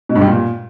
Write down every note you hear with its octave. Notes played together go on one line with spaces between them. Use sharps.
B2
G2
G3
A#2